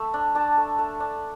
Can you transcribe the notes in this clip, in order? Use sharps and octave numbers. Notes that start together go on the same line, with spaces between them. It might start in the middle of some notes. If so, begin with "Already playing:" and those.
Already playing: A3 B5 E6
D4
D4 A5 D6
A3
A3
D4